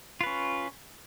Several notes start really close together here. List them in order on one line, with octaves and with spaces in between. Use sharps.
F4 B4 C#4